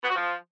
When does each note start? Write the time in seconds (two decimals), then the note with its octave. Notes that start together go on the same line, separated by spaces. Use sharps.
0.03 B3
0.10 F#4
0.16 F3